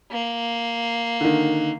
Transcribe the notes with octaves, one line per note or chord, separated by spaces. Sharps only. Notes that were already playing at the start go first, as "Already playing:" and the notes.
A#3
D3 D#3